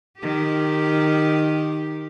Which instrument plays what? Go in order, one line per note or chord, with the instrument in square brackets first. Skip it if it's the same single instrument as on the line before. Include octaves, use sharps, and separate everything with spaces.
[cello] D#3 G4